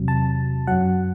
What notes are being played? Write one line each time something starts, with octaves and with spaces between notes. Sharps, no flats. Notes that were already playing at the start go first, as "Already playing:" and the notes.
Already playing: E2 C3 F#3
A5
F#2 F#3 F#5